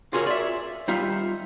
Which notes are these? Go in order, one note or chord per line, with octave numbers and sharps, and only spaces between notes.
F4 F#4 G#4 A#4 C#5
D5 E5
G3 D#4 F4 E5